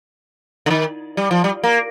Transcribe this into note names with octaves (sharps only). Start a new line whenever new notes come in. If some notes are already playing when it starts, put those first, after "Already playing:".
D3
D#3
G3
F3
G3
A#3